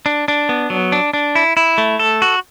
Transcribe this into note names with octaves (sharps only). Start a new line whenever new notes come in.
D4
D4
B3
F#3
D4
D4
E4
E4
A3
A4
F#4